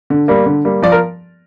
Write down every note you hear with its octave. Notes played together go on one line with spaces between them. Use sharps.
D3
G3 A#3
D3
G3 A#3
F3 D5
A#4